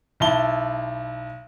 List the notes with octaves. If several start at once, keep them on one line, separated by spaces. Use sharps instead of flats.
B1 E4 A5 G7